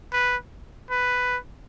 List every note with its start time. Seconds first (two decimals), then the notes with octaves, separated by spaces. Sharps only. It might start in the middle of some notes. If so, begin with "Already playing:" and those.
0.13 B4
0.90 B4